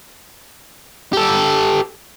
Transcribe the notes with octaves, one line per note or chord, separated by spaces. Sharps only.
G4 A4